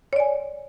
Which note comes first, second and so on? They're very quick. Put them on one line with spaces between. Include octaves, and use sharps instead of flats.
C#5 D5 G#5